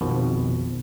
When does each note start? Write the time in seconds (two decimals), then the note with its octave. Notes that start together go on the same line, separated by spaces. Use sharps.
0.01 A#1 F2 B2 D#3 F3